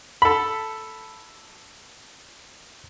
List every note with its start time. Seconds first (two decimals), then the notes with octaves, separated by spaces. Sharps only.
0.22 A4 B5